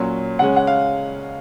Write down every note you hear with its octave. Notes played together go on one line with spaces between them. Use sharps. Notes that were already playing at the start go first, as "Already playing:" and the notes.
Already playing: A#2 F#3 C#4
C#3 G#3 C#4 F#5
F#5
F5